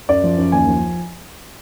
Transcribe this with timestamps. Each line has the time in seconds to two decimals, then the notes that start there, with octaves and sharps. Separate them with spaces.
0.09 F#2 D5
0.24 F3
0.38 F#2
0.52 D#2 G#5
0.68 F3